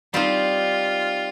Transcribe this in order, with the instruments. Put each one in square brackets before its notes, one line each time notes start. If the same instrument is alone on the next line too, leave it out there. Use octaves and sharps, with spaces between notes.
[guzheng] G3 C4 D#4 [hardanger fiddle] F4